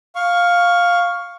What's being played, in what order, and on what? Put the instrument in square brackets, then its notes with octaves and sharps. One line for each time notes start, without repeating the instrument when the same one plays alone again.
[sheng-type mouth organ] F5 C#6